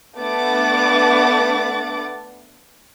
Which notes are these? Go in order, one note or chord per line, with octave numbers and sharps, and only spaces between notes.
A3 B3 D4 F#5 D6 A6